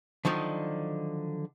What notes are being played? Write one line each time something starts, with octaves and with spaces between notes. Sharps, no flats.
D3 D#3 F3 F#3 D#4